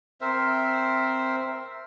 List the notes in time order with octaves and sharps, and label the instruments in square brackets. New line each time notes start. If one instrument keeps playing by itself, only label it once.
[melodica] C4 A#4 C5 E5